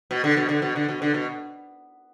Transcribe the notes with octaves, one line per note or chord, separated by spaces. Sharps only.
B2
D3
B2
D3
B2
D3
B2
D3
B2